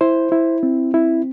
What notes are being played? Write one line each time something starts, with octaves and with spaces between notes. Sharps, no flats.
E4 C5
E4
C4
E4